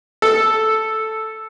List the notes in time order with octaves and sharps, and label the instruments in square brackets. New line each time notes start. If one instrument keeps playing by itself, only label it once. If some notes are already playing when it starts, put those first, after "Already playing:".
[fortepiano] A4